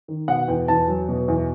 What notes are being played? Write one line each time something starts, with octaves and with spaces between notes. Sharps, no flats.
D#3
B2 F#5
E2 G5
E2 A5
F#3
B2
E2